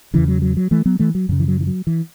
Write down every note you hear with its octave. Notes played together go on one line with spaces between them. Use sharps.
E2 C#3 E3
F#3
F#3
F#3
E3 A3
F#3 B3
E3 A3
F#3
F#2 C#3 E3
E3
F#3
E3
F#3
E3